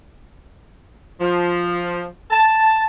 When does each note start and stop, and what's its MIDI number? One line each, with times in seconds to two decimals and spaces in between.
1.21 2.05 53
2.30 2.85 81